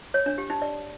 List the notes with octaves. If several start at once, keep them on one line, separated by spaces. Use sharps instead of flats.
C#5
D4
G4
D#4
D5